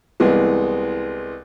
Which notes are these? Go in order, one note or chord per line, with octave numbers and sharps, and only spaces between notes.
C2 E3 G#3 B3